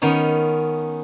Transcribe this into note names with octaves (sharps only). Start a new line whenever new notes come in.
D#3 B3 C#4 D#4